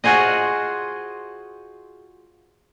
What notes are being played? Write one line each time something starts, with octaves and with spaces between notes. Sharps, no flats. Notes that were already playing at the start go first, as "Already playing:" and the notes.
F4 F#4 G#4 C5 D#5